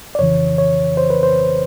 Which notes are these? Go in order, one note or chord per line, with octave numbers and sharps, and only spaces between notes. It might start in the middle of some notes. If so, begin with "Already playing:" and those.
D5
F2 C#3 E3 C#5
C#5
C5
B4
C5